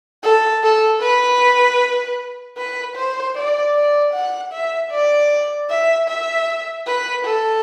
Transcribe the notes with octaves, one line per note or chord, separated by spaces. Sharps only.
A4
A4
B4
B4
C5
D5
D5
F#5
E5
D5
E5
E5
B4
A4